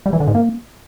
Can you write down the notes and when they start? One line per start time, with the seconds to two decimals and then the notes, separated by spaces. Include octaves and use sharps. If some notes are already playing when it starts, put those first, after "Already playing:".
0.06 G3
0.13 E3
0.20 D3
0.27 G#2
0.35 A#3